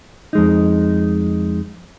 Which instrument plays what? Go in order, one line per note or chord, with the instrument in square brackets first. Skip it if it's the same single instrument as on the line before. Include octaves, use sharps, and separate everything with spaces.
[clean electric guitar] F2 G#3 D#4